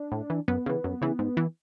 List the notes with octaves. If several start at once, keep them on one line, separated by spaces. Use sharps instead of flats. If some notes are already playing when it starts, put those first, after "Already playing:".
Already playing: D4
A2
E3
F#2 B3
C#3 E3
F#2
C#3 E3
G#2
E3